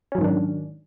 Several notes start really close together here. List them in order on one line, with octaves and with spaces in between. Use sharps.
C#4 F#3 G#2 D#3 D4